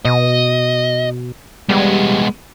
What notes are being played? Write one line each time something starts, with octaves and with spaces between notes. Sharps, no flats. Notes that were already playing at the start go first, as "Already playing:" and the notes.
B2 D#5
G3 G#3 B3